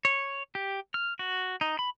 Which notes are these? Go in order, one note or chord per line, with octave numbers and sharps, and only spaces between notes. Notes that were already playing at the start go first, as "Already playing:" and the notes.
C#5
G4
F6
F#4
D#4
B5